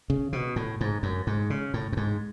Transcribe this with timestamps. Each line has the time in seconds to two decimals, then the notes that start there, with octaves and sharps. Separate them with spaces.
0.10 C#3
0.33 B2
0.56 A2
0.81 G#2
1.03 F#2
1.27 G#2
1.50 C#3
1.74 A2
1.92 F#2
1.97 G#2